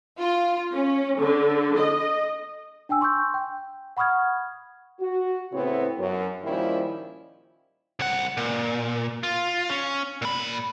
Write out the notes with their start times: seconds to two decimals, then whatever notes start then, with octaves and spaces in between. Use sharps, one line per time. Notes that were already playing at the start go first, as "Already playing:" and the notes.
0.19 F4
0.73 C#4
1.18 D3
1.77 D#5
2.89 D4 G5 G#5 E6
3.01 C6 C#6 E6 G6
3.34 G5
3.97 F#5 B5 C#6 D#6 F6 G#6
5.00 F#4
5.53 A2 C#3 B3 C4 E4 C#5
5.99 F#2
6.44 A#2 D#3 F3 G3 C#4 E4
7.99 C2 F#5
8.37 A#2
9.23 F4
9.70 C#4
10.22 A#2 B5